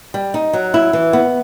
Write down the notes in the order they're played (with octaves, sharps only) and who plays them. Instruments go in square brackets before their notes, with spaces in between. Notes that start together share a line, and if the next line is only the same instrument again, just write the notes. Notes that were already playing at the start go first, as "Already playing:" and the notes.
[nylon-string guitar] G3
D#4
F#3
E4
E3
B3